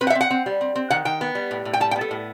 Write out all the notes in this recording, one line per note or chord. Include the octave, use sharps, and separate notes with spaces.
C4 B4
F#5
E5
C4
F#5
C4
G3
C4
C4
D#3 F#5
D#3 G5
B3
G3
A2
A2
G5
G3 A5
G5
B3
A4
A2